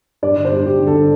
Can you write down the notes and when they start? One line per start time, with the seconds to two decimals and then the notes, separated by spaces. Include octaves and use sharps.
0.22 G2 D5
0.36 D3
0.45 C5
0.52 G2
0.66 G2 G4
0.80 D3
0.87 A4
0.94 D3